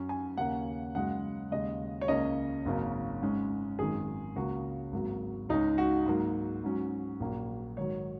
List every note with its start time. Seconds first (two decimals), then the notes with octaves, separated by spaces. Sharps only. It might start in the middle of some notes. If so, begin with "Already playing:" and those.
Already playing: F#2 F#3 C#4
0.09 G#5
0.37 D#2 C#3 A#3 C#4 F#5
0.95 F#2 C#3 G#3 C#4 F#5
1.51 D#2 C#3 G#3 D#5
2.01 C#5
2.08 C#2 C#3 A#3 C#4 D#5
2.66 G#1 F#2 C#3 A#3 C#4
3.22 G#2 G#3 C#4
3.79 G#1 F#2 D#3 G#3 G#4
4.36 C#2 C#3 A#3 F#4
4.92 G#1 G#2 F#3 A#3
5.49 C#2 C#3 G#3 C#4 D#4
5.78 F#4
6.06 G#2 F#3 A#3
6.63 G#2 F#3 C#4
7.20 A#1 A#2 F#3 A#3
7.77 G#2 D#3 F#3 C#5